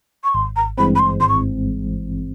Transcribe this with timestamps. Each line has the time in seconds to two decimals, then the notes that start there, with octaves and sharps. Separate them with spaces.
0.24 C#6
0.34 G#1 C6
0.56 A#5
0.78 G2 E3 G#3 C4 B5
0.95 B5
0.99 C6
1.20 G#1 C6
1.29 C#6